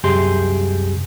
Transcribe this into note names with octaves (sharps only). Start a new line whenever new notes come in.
C2 F#2 G4 G#4 C6